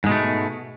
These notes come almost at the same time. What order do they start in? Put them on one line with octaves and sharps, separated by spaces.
G#2 G#3 B2 A3